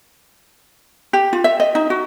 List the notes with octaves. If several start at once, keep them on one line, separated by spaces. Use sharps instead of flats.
G4
F4
E5
D#5
D#4
F#4